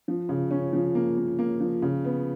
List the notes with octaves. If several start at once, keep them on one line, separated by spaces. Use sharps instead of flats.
F3
C#3
C#4
F3
A#3
A#3
A#3
F3
C#3
B3